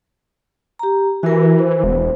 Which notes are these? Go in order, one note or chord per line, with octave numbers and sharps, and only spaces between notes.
G4 A#5
E3 F#4 A#4
C5
E1